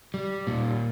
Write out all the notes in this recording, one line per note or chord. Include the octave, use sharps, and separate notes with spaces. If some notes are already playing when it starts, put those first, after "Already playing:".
G3
A#2